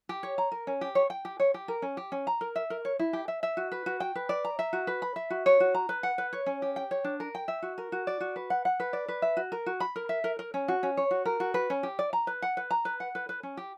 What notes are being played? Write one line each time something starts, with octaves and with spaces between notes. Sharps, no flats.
G4
C#5
A#5
A#4
C#4
G4
C#5
G5
G4
C#5
G4
A#4
C#4
G4
C#4
A#5
A#4
E5
A#4
C#5
E4
G4
E5
E5
F#4
B4
F#4
G5
B4
D5
A#5
E5
F#4
B4
B5
E5
F#4
C#5
F#4
A#5
B4
F#5
B4
C#5
C#4
G4
G5
C#5
D4
A#4
G5
E5
F#4
A#4
F#4
D5
F#4
B4
F#5
F#5
B4
D5
B4
E5
F#4
A#4
F#4
B5
A#4
E5
A#4
A#4
C#4
F#4
C#4
C#5
F#4
A#4
F#4
B4
C#4
G4
D5
A#5
B4
F#5
B4
A#5
B4
F#5
B4
B4
C#4
G4